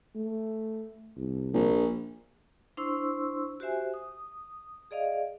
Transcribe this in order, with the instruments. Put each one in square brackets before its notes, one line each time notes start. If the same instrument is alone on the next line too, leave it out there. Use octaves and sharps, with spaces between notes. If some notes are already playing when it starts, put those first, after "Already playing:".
[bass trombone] A3
C2
[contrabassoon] A#1
[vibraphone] D4 E4 C5 C6 C#6 E6
F#4 G4 C5 E5 G#5
D#6
G#4 D5 D#5 F5